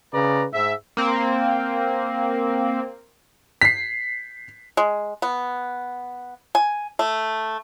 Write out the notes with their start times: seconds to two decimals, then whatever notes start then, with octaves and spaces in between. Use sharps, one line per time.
0.13 C#3 B4 D5 A#5
0.53 G#2 E5
0.97 A#3 C4
3.61 B6 C7
4.77 G#3
5.22 B3
6.55 G#5
6.99 A3